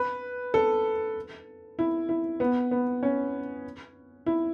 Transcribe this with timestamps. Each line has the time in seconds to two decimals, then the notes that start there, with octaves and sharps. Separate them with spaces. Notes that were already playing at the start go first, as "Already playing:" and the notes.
Already playing: B4
0.54 A4
1.79 E4
2.09 E4
2.40 B3
2.71 B3
3.03 C#4
4.26 E4